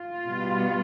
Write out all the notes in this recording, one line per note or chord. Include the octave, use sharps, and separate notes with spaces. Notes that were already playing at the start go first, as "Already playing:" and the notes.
Already playing: F4
B2 G3 B3